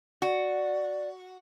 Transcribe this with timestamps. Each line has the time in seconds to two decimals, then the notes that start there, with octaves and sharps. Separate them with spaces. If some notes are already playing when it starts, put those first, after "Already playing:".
0.22 F#4 D5